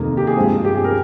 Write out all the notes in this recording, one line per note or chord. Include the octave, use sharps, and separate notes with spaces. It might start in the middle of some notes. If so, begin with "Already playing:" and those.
Already playing: F2 C3 D#3 A#3
G4
G#4
G2 F3 G#3 C4
G4
G#4
A#4